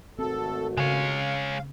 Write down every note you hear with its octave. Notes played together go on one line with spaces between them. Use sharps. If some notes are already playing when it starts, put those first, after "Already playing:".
G#1 A3 C4 F#4 A4
C#3 G#3 C#5 F5